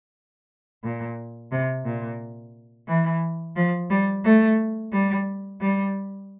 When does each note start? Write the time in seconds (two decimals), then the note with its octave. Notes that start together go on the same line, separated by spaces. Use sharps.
0.83 A#2
1.51 C3
1.84 A#2
2.88 E3
3.56 F3
3.90 G3
4.24 A3
4.91 G3
5.60 G3